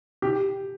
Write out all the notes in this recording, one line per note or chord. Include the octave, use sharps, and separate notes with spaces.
G4